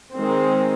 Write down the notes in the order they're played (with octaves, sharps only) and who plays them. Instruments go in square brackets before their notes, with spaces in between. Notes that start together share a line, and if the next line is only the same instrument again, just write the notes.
[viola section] D#3 G#3 C4